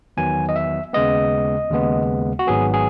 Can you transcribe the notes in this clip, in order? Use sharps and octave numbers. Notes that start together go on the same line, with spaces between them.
E2 D#3 F#3 B3 G#5
D#5
E5
D#2 C#3 G#3 B3 D#5
D#2 C#3 G#3 B3
F#4
G#1 G#2 F#3 B3 G#4
G#4